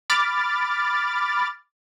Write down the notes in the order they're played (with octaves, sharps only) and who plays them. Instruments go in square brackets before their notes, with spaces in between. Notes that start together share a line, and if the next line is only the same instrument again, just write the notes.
[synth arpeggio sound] B5 D6 F6 A6